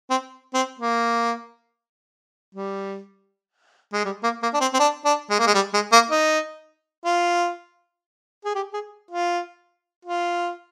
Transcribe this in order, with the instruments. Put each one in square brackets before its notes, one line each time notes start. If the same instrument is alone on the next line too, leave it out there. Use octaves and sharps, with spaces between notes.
[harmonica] C4
C4
A#3
G3
G#3
G3
A#3
A#3
D4
C4
C4
D4
D4
G#3
A#3
G#3
G3
G#3
A#3
D#4
F4
G#4
G4
G#4
F4
F4